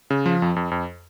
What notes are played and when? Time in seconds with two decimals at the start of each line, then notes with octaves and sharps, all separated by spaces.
0.10 C#3
0.26 F3
0.42 F2
0.56 F2
0.71 F2